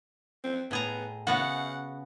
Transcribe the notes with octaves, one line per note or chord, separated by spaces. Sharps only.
C4
A2 B3 G#4 A#5
C#3 B3 F#4 F#5